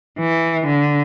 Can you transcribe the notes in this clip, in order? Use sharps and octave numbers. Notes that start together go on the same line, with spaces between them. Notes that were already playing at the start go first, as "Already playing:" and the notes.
E3
D3